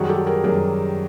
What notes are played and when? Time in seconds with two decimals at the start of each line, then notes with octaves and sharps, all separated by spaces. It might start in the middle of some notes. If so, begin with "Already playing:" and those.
Already playing: F#2 D#3 G3 F#4 G#4
0.09 G4 A4
0.27 G#4 A#4
0.44 F#2 D#3 G3 G#4 A#4